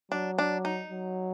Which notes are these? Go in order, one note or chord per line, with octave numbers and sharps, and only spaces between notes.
F#3 D4
D4
D#4
F#3